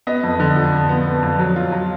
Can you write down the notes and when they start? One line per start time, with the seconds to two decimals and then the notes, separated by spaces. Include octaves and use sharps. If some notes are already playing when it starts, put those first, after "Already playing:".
0.07 B3 D#5
0.23 F2
0.40 D3
0.56 F3
0.72 F2
0.89 B3
1.06 B3
1.23 F2
1.40 F#3
1.56 F4
1.72 F#3